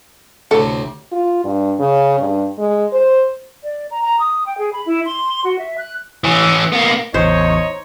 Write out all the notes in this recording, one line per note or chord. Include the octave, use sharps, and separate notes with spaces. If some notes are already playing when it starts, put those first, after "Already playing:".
D2 A2 C3 A4
F4
G2
C#3
G2
G#3
C5
D5
A#5
A#5
D#6
G5
G#4
B5
E4
C6
F#4
E5
F#6
E3 C#4
A#3 B3
A1 E2 D#4 C5 C#5 D#5